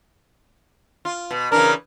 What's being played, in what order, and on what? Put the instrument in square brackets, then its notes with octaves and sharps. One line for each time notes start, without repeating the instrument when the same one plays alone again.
[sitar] F4
B2
[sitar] C#3 E3 D4 [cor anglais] A#4